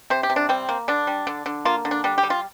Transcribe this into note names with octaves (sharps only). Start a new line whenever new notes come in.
C3 C5
G4
C3
D4
G3 C4
A#3
D3 D4
G3
D3
D3
A#3 F4
D3
D4
G3 D4
G4
G3
F4